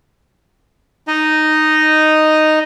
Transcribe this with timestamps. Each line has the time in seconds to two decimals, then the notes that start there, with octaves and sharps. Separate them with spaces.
1.08 D#4 D#5